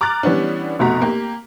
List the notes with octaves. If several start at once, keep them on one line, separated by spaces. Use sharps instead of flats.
A#5 D6 F6 F#6 A6
E3 G3 B3 C#4 D4
F1 B2 A3 F#4 A#5 B6
A#3 G4